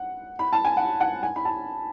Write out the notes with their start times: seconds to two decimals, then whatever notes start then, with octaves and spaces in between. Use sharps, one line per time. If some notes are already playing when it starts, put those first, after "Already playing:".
Already playing: F#5
0.39 B5
0.53 A5
0.65 G#5
0.77 F#5
1.00 F#5
1.23 G#5
1.36 B5
1.45 A5